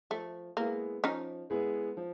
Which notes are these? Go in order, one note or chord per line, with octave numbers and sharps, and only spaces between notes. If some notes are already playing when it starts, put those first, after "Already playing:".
F3 A3
G#3 A#3 B3 E4 G#4
F3 C#4 D#4
G#3 B3 E4 G#4
F3